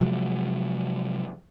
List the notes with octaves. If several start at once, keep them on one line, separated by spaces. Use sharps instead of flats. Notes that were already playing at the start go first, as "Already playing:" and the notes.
C3 F3 F#3 G#3